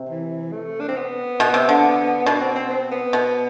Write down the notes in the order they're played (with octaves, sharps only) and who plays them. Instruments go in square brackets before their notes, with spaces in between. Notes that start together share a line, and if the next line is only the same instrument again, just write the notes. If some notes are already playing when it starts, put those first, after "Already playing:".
Already playing: [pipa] C3
[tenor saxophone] E3
A3
D4
C4
B3
[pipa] B2
C3
D3
[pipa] B2 [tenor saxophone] D4
[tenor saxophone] C4
C4
C4
B3
[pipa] B2